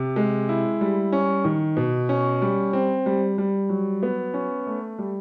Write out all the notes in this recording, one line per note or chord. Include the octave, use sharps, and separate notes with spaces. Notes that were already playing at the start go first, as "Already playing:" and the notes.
Already playing: C3
G#3
E4
G3
C#4
D#3
B2
C#4
G3
C4
G3
G3
F#3
B3
C#4
A3
G3